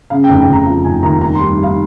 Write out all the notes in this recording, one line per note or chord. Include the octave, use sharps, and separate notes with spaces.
C#3 F5
G5
F1
G5
F1 A#5
F3
F1 G#5
D#2 A#5
G2 A#5
C6
G3
G3
F5